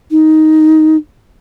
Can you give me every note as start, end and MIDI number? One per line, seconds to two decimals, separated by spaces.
0.11 0.96 63